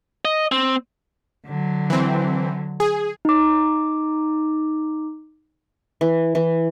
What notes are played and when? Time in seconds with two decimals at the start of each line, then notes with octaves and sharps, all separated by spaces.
0.25 D#5
0.52 C4
1.46 D3 F#3
1.90 E3 C4
2.80 G#4
3.25 D#4 D6
6.01 E3
6.35 E3